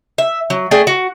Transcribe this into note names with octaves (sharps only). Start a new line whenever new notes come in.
E5
F#3
A3 G#4 D5 G5
F#4